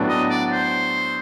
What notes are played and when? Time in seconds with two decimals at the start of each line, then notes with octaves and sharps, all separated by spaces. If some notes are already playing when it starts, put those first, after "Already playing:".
Already playing: A2 F#3 B3 D4
0.08 D#5
0.30 D5
0.51 C5